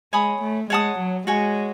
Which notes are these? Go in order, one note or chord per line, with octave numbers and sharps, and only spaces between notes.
G#3 C#5 G#5 B5 D#6
A3
G#3 C#5 F#5 A5 D#6
F#3
G#3 F#4 C#5 G#5